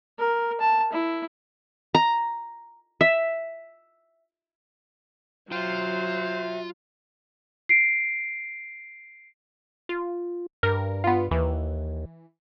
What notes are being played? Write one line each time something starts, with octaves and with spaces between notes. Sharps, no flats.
A#4
A5
E4
A#5
E5
F#3 F4 C5 E5 G5
C7 D7
F4
G2 A#4
B3 F4
D#2 E3